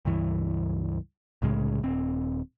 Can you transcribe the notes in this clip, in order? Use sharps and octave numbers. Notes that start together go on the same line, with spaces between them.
C#2 G2 E3
C2 A2 C#3 G#3
D#1 C4